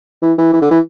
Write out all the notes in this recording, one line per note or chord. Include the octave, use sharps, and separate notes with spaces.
E3
E3
E3
D3
E3